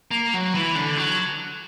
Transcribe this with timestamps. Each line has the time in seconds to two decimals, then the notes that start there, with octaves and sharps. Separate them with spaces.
0.11 A#3
0.34 F#3
0.55 E3
0.75 D3
0.97 F#3